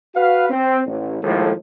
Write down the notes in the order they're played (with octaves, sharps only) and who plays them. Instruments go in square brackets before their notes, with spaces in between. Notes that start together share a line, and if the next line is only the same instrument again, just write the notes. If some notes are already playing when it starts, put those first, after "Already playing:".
[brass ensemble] F#4 B4 F5
C4
A1
D#2 A2 F3 G#3 A4